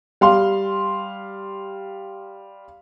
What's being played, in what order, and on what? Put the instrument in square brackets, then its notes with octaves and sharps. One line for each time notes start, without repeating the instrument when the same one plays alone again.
[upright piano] G3 F5 C6